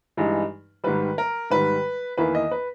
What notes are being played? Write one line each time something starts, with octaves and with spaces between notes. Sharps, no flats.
G2 E3 G#3 D#4
G#2 D#3 G3 B4
A#4
G#2 D#3 G3 B4
E2 D#3 A#3 E4 B4
D#5
B4